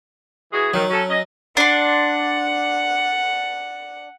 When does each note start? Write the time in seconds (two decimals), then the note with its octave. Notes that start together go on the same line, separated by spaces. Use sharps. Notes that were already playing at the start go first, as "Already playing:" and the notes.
0.52 E3 F#4 G#4
0.74 D#3 F#3
0.91 C#4 F#4 A4
1.08 C#4 D#5
1.57 D4 F#5 C6